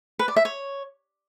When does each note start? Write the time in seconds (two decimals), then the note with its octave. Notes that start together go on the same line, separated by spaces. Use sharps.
0.19 B4
0.28 D5
0.36 E5
0.45 C#5